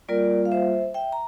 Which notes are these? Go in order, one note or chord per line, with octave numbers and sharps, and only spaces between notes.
G3 A#3 F4 A#4 D5
F5
C5 E5
E5 G5
A#5